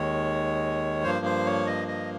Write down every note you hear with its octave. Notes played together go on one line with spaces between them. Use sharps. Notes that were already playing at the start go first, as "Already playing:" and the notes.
Already playing: D#2 D#3 G#3 C#5
G2 F3 A#3 C5
C5
C#5
D#5
D#5